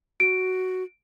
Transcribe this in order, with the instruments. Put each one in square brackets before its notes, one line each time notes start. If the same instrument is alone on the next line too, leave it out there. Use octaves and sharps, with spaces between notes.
[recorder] F#4 [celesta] D7